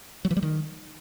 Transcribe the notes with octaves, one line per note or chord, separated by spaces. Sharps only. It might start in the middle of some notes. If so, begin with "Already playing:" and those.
F#3
E3
G3
D#3